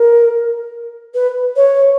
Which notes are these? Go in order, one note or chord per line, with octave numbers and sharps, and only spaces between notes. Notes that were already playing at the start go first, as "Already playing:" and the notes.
Already playing: A#4
B4
C#5